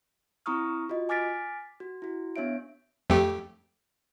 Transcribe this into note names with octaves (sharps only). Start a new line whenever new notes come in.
C4 E4 A#5 C#6 D#6 F6
F4 F#4 D#5
G#5 D6 F6 A6 B6 D7
F#4
E4 F#4
B3 D4 C#5 E5 D7
F2 A3 G4